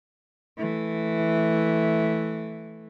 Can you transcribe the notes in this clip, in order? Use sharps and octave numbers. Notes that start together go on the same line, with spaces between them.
E3 A3